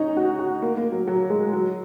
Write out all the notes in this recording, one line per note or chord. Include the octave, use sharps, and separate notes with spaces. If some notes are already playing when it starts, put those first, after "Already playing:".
Already playing: C#4 D#4
F#4
F#4
A#3
A#3
F#3
F#3
G#3
F#3